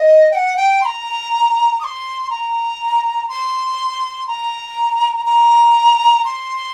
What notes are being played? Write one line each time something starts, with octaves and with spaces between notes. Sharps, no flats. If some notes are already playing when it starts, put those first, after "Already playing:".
Already playing: D#5
G5
F#5
G5
C6
A#5
D#6
C6
A#5
C6
A#5
A#5
C6